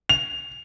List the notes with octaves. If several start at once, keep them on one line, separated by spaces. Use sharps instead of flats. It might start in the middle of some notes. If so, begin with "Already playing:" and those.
F7